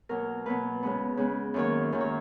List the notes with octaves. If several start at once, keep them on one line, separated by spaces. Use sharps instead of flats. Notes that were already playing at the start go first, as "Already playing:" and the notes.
B2 F#3 A#3 A#4
B2 F#3 A#3 B4
C#3 G#3 B3
C#3 G#3 B3
F#2 D#3 F#3 A#3 C#5
F#2 D#3 F#3 A#3
C#5